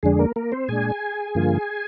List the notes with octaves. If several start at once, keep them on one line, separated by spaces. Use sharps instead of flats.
F2 D3 G#3 D4 G#4
A#3 A#4
A#3 A#4
C4 C5
A#2 G#3 D4 G#4 G#5
G2 D3 F3 A#3 F4